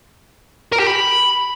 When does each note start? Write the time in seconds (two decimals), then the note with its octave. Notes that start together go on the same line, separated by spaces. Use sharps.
0.73 A#4
0.80 G4
0.87 B5